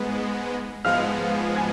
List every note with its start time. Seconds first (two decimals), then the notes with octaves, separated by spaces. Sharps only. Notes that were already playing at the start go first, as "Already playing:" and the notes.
Already playing: G#2 G#3 B3
0.84 G#2 F3 G#3 B3 F5 F6
1.56 G#5 G#6